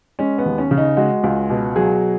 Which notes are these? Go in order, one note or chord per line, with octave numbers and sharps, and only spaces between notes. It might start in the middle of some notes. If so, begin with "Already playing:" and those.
G#3 C#4
B3
D#2
C#4
C#3
D#4
G#3 F#4
C#2
B2
F#3 G#4